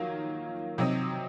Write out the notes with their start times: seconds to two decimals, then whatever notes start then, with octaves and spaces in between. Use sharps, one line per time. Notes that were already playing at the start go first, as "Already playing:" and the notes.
Already playing: D#3 F#3 A#3 F4
0.78 C3 F#3 C4 D#4